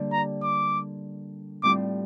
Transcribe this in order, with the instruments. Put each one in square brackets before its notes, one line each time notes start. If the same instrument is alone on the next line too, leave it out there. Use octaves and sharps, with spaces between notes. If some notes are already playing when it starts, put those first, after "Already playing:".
Already playing: [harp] D3 G3 A#3 D4 G4
[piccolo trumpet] A#5
D6
[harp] A2 G3 C4 F4 [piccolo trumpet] D6